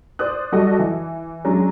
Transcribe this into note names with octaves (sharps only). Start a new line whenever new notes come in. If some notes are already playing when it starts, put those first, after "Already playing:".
C5 D5 D#6 F#6
G3 F#4 A4 D5 D#5
E3
F#3 G#3 C#4 D4